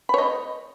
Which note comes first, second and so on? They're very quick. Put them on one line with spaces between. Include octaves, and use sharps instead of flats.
B5 C#5 D#5